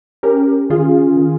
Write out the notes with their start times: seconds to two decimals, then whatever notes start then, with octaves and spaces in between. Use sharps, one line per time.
0.23 C#4 G4 A#4
0.70 D#3 F4 G#4
1.17 D#3